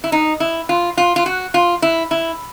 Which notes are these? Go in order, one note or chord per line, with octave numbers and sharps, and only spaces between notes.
E4
D#4
E4
F4
F4
F4
F#4
F4
E4
E4